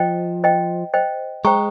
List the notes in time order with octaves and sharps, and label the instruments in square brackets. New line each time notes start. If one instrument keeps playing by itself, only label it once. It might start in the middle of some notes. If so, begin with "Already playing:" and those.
Already playing: [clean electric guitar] F3 [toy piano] C5 D#5 G5
[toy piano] C5 D#5 G5
C5 D#5 G5
[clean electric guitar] G#3 [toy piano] C5 G5 A#5 C#6